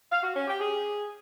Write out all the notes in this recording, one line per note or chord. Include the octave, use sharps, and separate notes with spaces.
F5
F#4
C#4
G4
G#4